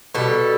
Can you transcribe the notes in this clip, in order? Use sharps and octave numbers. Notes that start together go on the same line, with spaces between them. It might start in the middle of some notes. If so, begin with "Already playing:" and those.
B2 G3 A4